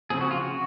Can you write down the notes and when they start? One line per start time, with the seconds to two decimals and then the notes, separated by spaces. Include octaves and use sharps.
0.10 C#3 F3 C4 G#4
0.21 F#4
0.31 F4
0.41 F#4